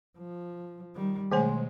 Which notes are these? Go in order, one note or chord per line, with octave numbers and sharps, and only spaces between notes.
F3
D#3 G3
B2 D#3 G#3 A3 G#4 C5 G#5